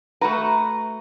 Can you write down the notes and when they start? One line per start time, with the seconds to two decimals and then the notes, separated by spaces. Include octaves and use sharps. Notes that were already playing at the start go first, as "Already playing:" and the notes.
0.21 A3 F#4 B4 A#5